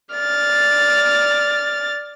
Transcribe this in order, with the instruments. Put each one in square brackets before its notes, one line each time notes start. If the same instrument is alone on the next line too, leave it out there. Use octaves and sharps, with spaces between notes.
[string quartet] D5 F6 A6